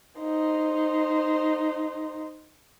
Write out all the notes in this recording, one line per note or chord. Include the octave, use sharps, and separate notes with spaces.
D#4 C5